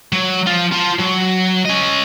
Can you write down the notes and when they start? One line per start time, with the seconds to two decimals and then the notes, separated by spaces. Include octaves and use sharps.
0.13 F#3
0.47 F3 F4
0.72 F4 A5
1.00 F#3
1.66 C#4 D#5